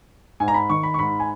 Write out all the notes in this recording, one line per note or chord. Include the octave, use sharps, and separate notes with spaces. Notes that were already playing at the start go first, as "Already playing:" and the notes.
G#2 G#5
A#5
B5
D#3 C#6
B5
C#6
G#2 B5
G#5